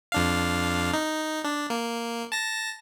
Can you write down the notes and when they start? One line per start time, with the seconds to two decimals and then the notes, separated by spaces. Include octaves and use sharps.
0.12 F2 D4 F5
0.93 D#4
1.44 D4
1.70 A#3
2.32 A5 A#6